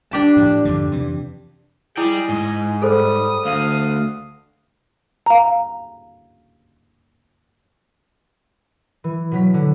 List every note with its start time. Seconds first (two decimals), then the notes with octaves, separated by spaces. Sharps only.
0.11 D4 G4 A5
0.37 A2 F3
0.65 F2 G#2 D3
0.92 F2 C3 E3
1.97 E4 G#4 D5 D#5 G5
2.29 G#2 G#5
2.82 G3 G#4 A4 C5 D#6
3.46 D2 F5
5.26 F5 A#5
9.04 E3
9.31 B2 F#3 B6
9.54 D3